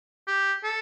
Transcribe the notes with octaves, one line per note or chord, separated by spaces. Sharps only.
G4
A4